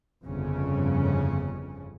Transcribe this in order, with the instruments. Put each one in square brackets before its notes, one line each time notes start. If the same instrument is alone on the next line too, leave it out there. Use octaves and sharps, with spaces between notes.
[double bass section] G1 F2 C#3 C#4